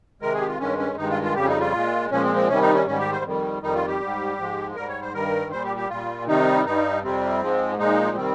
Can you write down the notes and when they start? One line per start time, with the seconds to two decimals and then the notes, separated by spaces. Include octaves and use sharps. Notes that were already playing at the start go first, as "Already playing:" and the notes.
0.21 C3 D#3 G#3 A#4
0.34 G#4
0.41 G4
0.47 F4
0.59 G2 D#3 G#3 C#4
0.78 C#4
0.97 G2 D#3 G#3 D#4
1.10 F4
1.23 F4
1.35 F2 C#3 G3 G4
1.42 C#4
1.48 D#4
1.60 F4
1.73 A#2 G#3
2.11 A#2 F3 G#3 C#4
2.24 C4
2.36 C4
2.49 C3 D#3 G3 C#4
2.62 D#4
2.74 C#4
2.86 G#2 D#3 G3 C#4
2.99 G4
3.12 C5
3.24 F2 D#3 G3
3.62 F2 D#3 G3 D#4
3.75 F4
3.88 G4
4.00 G#2 G3
4.38 G#2 F3 G#3
4.76 G#2 G3 A#4
4.89 C#5
5.02 C5
5.14 G2 D#3 G3 A#4
5.51 A#2 G3 C5
5.64 G4
5.77 G4
5.89 A#2 G3 F4
6.27 C3 D#3 G3 D#4
6.65 G2 G3 D#4
7.03 F2 C3 G3 C4
7.41 G#2 F3 G#3
7.79 A#2 F3 G#3 D#4
8.16 C3 D#3 G3 C4